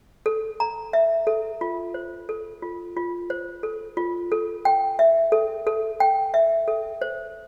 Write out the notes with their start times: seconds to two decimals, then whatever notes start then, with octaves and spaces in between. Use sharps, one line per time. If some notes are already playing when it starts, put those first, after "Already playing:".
0.26 A4
0.60 A#5
0.93 E5
1.27 A4
1.61 F4
1.94 C5
2.29 A4
2.62 F4
2.97 F4
3.30 C5
3.63 A4
3.97 F4
4.32 A4
4.65 G5
4.99 E5
5.32 A4
5.67 A4
6.00 G5
6.34 E5
6.68 A4
7.02 C5